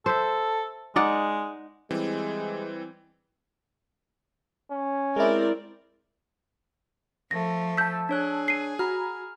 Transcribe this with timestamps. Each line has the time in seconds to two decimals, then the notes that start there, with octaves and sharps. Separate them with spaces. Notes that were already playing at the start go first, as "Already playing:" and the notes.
0.06 A4 C5 E5
0.96 G#3 D#4 D5 F#5
1.91 E3 G3 G#3 C4
4.71 C#4
5.16 G#3 C4 E4 A#4 D5
7.31 F3 A3 A#6
7.77 A5 E6 G6 B6
8.09 D4 G#4 C#5 F#6
8.48 C7 D#7
8.79 F#4 A#5 B5 F6